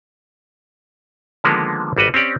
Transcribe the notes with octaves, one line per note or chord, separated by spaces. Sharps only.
D3 D#3 F3 G#3 A#3 B3
G#1 G3 F#4 B4 D#5
C4 C#4 G4 D5